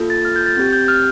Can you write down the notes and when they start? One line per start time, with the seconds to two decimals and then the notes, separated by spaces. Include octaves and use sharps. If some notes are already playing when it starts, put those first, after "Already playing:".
Already playing: A#3 F4 A4
0.10 A6
0.25 F6
0.36 G6
0.46 A6
0.57 C4 A6
0.60 G4
0.73 G6
0.88 F6